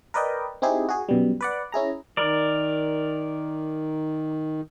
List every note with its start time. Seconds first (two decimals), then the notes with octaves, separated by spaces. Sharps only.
0.14 A#4 B4 D5 D#5 G5
0.62 C4 D#4 E4 G4 G#4
0.89 F#4 G#4
1.09 F#2 B2 G3
1.41 B4 D5 F#5
1.72 C#4 E4 G#4 A#5
2.17 D#3 A#4 D5